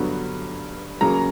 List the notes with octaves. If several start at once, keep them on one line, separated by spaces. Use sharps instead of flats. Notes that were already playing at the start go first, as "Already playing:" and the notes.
Already playing: G2 D3 F#3 B3
C#3 F#3 A#3 A#5